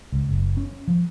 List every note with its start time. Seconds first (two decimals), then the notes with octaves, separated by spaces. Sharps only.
0.12 C#2
0.29 F#1
0.57 C#4
0.88 F3